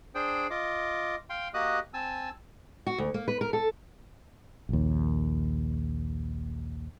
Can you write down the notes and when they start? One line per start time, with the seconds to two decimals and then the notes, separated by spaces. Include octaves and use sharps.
0.15 D4 G#4 C5 G5
0.50 F4 D#5 D6
1.30 F5 G5 C6
1.54 A#3 F#4 G4 D#5 D#6 F#6
1.94 C4 G#5 A5 E6
2.87 F#4
2.98 D2
3.14 A#3
3.28 B4
3.41 A#4
3.53 A4
4.69 A#1 D#2